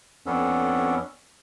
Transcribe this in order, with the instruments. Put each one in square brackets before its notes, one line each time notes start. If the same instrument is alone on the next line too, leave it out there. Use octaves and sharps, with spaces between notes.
[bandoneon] F2 B3 C#4 D4 A4